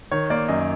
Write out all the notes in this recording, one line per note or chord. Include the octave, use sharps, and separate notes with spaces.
D#3 C#5
A#3 D5
F#2 D#5